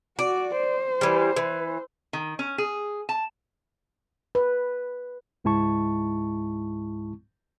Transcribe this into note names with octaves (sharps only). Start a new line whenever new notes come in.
F#4 D5
C5
E3 G3
E3
D#3
C#4
G#4
A5
B4
C#2 G#2 G#3 E4 A5 C#6